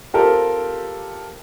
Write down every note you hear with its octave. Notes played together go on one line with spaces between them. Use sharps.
C4 F4 G4 A4 A#4